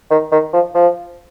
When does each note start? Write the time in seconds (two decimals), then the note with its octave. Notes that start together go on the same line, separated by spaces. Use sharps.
0.11 D#3
0.32 D#3
0.53 F3
0.74 F3